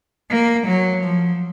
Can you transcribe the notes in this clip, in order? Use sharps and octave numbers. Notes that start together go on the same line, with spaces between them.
A#3
F#3
F3